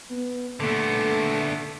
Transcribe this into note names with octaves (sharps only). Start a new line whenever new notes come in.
B3
A#2 D3 A3 B3